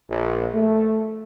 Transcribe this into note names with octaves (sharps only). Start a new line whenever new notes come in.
A#1
A3